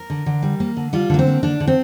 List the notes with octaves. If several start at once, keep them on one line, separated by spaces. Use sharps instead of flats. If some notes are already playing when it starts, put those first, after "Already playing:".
Already playing: A#4
D3
D3
G3
A#3
D3
G3 F4
D3 A#3
C4
A#3
D3 D4
D3
C4